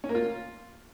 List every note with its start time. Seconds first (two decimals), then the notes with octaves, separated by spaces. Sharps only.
0.04 C#4
0.09 A#3
0.15 F4